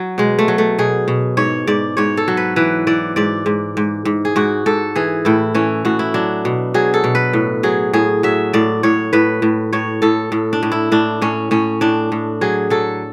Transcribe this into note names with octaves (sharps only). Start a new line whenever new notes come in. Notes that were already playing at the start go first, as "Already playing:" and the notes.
Already playing: F#3
B2 G#3
A3
F#3
A3
B2 G#4
B2
G#2 C#5
G#2 D5
G#2 C#5
A4
F#3
B4
E3 B4
E3 D5
G#2 D5
G#2
G#2
G#2
G#4
G#2 F#4
G#2 A4
E3 G#4
A2 E4
E3 C#4
A2 F#4
E4
F#3 D4
B2
F#3 G#4
A4
B2
B4
A2
F#3 G#4
A2 G#4
F#3 E5
A2 D5
A2 C#5
A2 B4
A2
A2 C#5
A2 A4
A2
D4
A2
E4
A2 D4
A2 C#4
A2 C#4
A2 D4
A2
F#3 G#4
F#3 A4